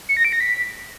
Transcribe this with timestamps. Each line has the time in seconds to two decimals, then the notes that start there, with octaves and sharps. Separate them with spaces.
0.09 C#7
0.17 A#6
0.25 D7
0.32 A#6
0.40 B6